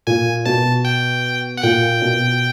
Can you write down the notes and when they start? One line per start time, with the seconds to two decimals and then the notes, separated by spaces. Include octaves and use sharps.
0.07 A#2 G#5
0.45 B2 A5
0.85 G5
1.57 F#5
1.63 A#2 G5
2.02 B2